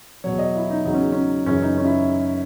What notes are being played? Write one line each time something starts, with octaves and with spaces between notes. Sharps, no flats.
E2 B2 F#3 C#5
D#5
E4
D#4
E2 C#3 F#3 D#4
C#4
C#4
F#2 C#3 E3 C#4
D#4
C#4
E4